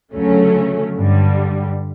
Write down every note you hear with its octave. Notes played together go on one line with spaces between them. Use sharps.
D2 C#3 F#3 A3 C#4
G2 D3 G3